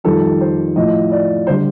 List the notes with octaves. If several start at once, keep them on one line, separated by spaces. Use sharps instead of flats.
F2 D#3 G3 A4
C5
A2 F3 D#5
D5
D3 G3 C5